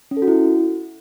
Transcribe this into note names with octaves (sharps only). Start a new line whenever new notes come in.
C#4
A4
F#4
E4